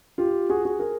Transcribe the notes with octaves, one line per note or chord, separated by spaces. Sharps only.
F4 G4
F#4 G#4
F#4 G#4
G#4 A#4